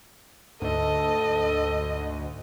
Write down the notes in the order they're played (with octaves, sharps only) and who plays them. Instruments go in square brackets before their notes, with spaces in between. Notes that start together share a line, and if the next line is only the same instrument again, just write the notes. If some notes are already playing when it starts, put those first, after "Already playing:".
[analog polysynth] D2 [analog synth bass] G#2 [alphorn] A4 [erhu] D#5